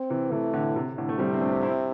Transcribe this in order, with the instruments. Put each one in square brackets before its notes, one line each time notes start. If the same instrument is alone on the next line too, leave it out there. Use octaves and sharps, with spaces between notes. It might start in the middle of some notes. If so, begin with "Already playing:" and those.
Already playing: [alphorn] C4
[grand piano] C3 E3
[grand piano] C3 E3 [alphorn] A3
[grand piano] A2 D3
C3
A2 D3
A3
[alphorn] C3 [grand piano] G3 C4
[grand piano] C4
A3 D4
G4
C4 E4